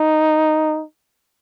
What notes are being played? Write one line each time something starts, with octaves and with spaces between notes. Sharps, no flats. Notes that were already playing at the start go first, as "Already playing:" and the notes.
Already playing: D#4